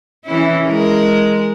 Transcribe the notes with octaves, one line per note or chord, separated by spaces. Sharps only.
E3 C#4 E4
G#3 A#4